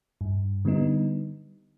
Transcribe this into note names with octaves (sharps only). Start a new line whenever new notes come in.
G2
D3 G3 B3 D#4